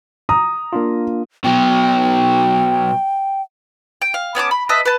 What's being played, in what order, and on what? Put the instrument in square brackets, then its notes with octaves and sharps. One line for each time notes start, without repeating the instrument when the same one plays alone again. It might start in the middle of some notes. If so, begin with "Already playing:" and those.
[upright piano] A#5 D#6
[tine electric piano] A#3 D4 F4
[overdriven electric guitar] B2 F#3 [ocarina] G5
[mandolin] G5
F5
B3 C#4 A5 D6
B5
B4 D#5 E5 A5
B4 A5